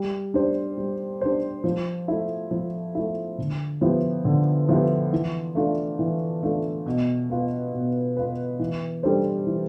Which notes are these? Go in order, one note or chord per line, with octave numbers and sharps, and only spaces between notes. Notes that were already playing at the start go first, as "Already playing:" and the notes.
Already playing: G3
D4 G4 C5
G3
D4 G4 C5
F3
A3 E4
F3
A3 E4
D3
F3 B3 E4 G4
D3
F3 B3 E4 G4
E3
A3 D4 F4
E3
A3 D4 F4
B2
B3 F4 B4
B2
B3 F4 B4
E3
G3 D4 A4 C5
E3